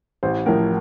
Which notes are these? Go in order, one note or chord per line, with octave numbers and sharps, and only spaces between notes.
A1 C5
A2 F3 A#4